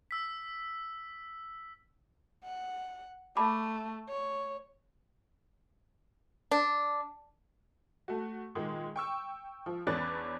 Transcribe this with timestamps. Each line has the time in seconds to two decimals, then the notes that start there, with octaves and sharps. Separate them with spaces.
0.11 E6 B6
2.44 F#5
3.37 A3 A5 B5 D6
4.09 C#5
6.51 D4
8.08 A3 F#4
8.55 A#2 D#3 G#3
8.96 G5 C#6 E6
9.66 F3
9.87 E2 C#4 D4 B4 F#6 A6